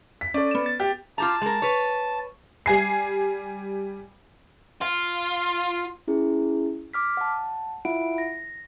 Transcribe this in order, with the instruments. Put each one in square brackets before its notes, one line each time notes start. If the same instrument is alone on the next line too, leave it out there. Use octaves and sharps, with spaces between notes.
[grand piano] B6
[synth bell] C#4 A4 [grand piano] D5
[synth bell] B3 E7
A6
[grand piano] G4
[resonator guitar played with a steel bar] F4 G4 A#5 [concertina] A5
[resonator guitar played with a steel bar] G#3 A#4
B4 C#5
[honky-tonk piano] G3 G#5 C7
[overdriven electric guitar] F4
[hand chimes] C#4 E4 G#4
D6 F6 B6
F#5 A5
E4 F4 E5 F#5 B5 D7
A#6